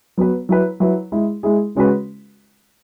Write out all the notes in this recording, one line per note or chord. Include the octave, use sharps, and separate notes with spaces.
F#3 B3 F#4 B4
F#3 E4 B4
F#3 E4 B4
G#3 E4 G#4
G#3 E4 G#4
C#3 G#3 C#4 F#4 B4